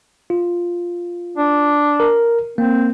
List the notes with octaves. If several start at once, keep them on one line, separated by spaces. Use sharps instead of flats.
F4
D4
A#4
A#3 C4